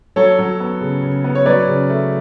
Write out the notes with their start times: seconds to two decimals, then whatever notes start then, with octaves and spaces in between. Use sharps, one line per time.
0.16 F#3 A4 C#5
0.39 F#3
0.60 B3
0.81 C#3
1.03 C#3
1.24 B3
1.35 C#5
1.46 F#3 B4 D5
1.68 C#3
1.89 A3